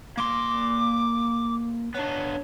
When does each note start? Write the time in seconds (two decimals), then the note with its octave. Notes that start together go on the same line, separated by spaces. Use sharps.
0.17 A#3 C6 D6
1.94 B3 D4 C#5